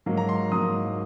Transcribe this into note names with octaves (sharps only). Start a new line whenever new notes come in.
G#2 F#3 A#3
A#5
C6
G#2 F#3 A#3 D#6